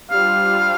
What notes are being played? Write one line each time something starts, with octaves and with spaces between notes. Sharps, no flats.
G3 D4 F4 C5 F5